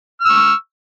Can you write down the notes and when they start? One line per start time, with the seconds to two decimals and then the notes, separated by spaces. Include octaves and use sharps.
0.21 F6
0.25 E6
0.29 C#6